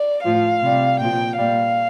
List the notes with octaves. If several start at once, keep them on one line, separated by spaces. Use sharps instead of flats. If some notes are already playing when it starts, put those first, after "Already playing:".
Already playing: D5
A2 F3 F5
C3 G3
A#2 F3 G5
A#2 G3 F5